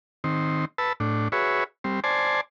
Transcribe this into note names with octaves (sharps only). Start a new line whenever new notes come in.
D#3 C4
B4 A5 E6
A2 D4
F#4 G#4 B4 C#5 E5
G3 C4
C5 D5 G#5 A5